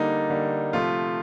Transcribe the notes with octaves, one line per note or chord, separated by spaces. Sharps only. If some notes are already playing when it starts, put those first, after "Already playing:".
Already playing: D3 G3 A#3 D#4
D3 G3 A#3
C3 F3 A3 F4